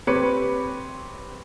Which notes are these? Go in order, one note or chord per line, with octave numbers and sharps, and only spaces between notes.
C4 G4 B4 C#5 B5 C#7